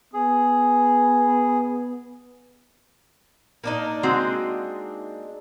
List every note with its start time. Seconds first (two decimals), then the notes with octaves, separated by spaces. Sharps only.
0.14 B3 G#4
3.64 A#3 D4 D#4
4.03 G#3 C4 F#4